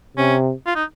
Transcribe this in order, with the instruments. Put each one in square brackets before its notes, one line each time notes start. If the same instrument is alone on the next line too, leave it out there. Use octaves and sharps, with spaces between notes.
[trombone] C3 [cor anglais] C#4
[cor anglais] F4
D#4